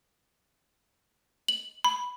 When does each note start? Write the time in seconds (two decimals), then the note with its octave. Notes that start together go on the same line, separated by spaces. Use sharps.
1.48 F#7
1.84 B5